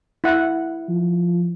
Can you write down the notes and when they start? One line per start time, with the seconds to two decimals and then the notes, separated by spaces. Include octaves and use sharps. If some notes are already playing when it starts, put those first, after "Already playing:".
0.24 E4 F#5
0.89 F3